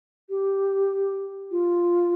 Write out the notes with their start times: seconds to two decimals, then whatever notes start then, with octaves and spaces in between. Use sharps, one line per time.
0.30 G4
1.51 F4